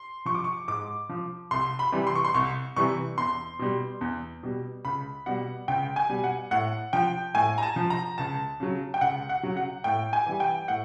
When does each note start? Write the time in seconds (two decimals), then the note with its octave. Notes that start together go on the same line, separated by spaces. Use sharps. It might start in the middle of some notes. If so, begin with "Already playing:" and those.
Already playing: C6
0.26 F3 C#6
0.35 D6
0.44 C#6
0.68 G#2 D6
1.09 F3
1.51 C2 C6
1.79 B5
1.92 C3 E3 G3
2.07 C6
2.15 C#6
2.25 C6
2.34 C2 C#6
2.76 C3 E3 G3 C#6
3.18 E2 C6
3.59 B2 G3
4.01 E2
4.43 B2 G3
4.85 C#2 B5
5.26 B2 G3 F#5
5.68 C#2 G5
5.96 G#5
6.09 B2 G3
6.24 F#5
6.51 A2 F#5
6.93 F3 G5
7.34 A2 G#5
7.58 A#5
7.63 A5
7.76 F3
7.90 A#5
8.18 C#2 A5
8.60 C#3 F#3
8.94 G5
9.01 C#2 F#5
9.29 F#5
9.43 C#3 F#3
9.57 F#5
9.84 A2 G5
10.13 G#5
10.26 E3 G3
10.40 G5
10.68 A2 F#5